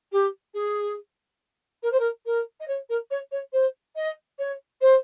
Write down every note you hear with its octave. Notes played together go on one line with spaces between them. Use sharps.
G4
G#4
A#4
C5
A#4
A#4
D#5
C#5
A#4
C#5
C#5
C5
D#5
C#5
C5